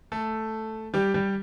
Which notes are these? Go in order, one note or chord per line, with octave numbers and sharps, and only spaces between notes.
A3 A4
G3 G4
G3 G4